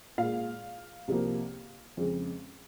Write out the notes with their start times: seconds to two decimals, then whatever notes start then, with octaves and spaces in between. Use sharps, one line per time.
0.18 A#2 G#3 F5
1.08 C2 C3 F3 A#3
1.97 F2 C#3 G#3